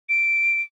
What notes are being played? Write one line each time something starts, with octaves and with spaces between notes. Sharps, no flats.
D7